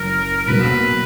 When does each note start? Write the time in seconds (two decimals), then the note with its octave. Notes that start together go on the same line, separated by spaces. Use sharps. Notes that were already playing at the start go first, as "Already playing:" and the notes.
Already playing: F#1 F#2 A#4
0.41 A#4
0.47 B2 F#3 A#3 B4